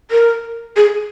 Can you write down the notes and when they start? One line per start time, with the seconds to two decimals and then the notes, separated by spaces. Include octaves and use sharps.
0.11 A#4
0.76 G#4